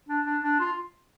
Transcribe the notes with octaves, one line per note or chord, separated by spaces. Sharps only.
D4
D4
D4
F4